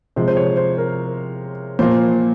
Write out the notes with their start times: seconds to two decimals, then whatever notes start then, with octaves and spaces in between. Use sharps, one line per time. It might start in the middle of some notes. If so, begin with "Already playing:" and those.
0.16 C3 F3 G#3 C5
0.28 C5
0.37 C#5
0.57 C5
0.78 A#4
1.79 A#2 F3 A#3 C5